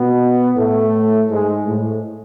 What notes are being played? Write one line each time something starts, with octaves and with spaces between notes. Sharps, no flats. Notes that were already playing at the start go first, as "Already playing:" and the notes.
Already playing: B2 B3
A2 A3
G#2 G#3
A2